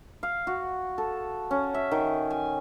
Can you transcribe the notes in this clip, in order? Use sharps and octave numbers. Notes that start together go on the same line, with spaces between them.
F5
F#4
A4
C#4
E5
D#3
G#5